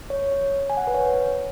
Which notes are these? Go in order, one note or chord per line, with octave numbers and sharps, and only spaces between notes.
C#5
G#5
F#5
B4
C#5